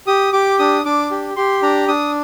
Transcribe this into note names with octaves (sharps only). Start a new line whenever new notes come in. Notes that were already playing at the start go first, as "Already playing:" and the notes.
G4 D#6
G4 D6
D4 D#6
D4 D6
G4
G4 C6
D4 A#5
D4 D#6